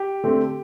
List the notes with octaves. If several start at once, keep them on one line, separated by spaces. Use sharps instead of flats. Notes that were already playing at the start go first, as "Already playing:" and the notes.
Already playing: G4
D3 A3 C4